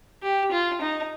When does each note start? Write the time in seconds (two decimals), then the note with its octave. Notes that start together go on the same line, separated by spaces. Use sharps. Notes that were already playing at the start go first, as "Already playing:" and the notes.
0.22 G4
0.51 F4
0.81 D#4